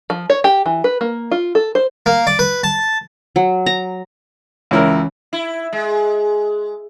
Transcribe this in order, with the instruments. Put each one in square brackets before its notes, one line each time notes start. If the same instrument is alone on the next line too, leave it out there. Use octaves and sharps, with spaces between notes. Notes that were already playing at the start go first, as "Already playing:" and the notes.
[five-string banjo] F3
C#5
G4
E3
B4
A#3
F4
A4
C5
[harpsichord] A#3
D5
B4
A5
[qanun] F#3
A#5
[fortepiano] C#2 E4 A#4 [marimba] E3 C#4 C#5
[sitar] E4
G#3